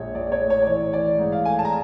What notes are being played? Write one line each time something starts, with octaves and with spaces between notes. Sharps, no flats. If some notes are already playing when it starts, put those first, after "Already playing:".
Already playing: A#1 G#3 C#5
A#1 D5
C#5
A2
C#5
D5
E3 C#5
E3 D5
G#2
F5
A3 G#5
A5
A#5